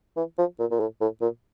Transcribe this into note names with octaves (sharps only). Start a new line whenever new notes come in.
E3
F3
A#2
A#2
A2
A2
A#2